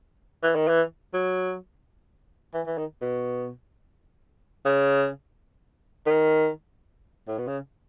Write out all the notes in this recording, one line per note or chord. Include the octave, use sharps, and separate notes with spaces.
E3
D#3
E3
F#3
E3
E3
D#3
B2
C#3
D#3
A2
B2
C#3